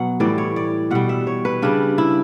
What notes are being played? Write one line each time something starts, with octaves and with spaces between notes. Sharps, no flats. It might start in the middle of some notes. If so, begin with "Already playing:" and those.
Already playing: B2 F#3 F#5
A2 E3 G3 D5
C#5
D5
B2 G3 F#5
E5
C#5
B4
C#3 G3 D4
E4